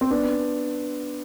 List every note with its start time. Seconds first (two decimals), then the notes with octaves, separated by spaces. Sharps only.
0.01 C4
0.10 B3 D4